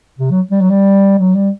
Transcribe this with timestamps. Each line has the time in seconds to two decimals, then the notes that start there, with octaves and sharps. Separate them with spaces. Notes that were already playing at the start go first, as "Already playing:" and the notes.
0.19 C3
0.31 F#3
0.51 G3
0.61 F#3
0.70 G3
1.19 F#3
1.35 G3